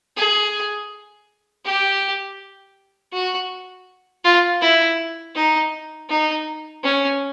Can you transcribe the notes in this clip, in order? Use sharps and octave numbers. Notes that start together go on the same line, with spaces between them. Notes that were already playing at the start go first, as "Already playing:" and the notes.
G#4
G4
F#4
F4
E4
D#4
D#4
C#4